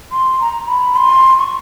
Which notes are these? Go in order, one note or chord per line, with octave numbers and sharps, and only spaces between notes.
C6
A#5
B5
C6
C#6